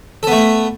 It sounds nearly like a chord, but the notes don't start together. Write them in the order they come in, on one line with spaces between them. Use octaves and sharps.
A4 B3 A3